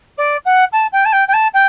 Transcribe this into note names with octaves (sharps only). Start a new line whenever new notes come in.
D5
F#5
A5
G5
A5
G5
G5
A5
G5